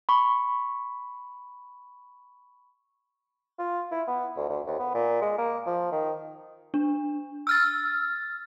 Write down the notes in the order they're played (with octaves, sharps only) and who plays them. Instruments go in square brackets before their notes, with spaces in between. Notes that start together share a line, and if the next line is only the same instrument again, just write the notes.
[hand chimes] B5 C#6
[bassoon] F4
E4
B3
D2
D2
D#2
B3
A#2
G#3
A#3
F3
D#3
[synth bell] D4
E6 F6 A6